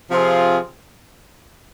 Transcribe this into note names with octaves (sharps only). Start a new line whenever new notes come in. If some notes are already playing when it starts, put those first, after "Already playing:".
C3 F3 C4 F4 G#4